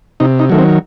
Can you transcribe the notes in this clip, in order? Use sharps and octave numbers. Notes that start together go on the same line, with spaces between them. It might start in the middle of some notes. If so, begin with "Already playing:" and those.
C3 D#4
D#4
D#3 F#3 A3
C4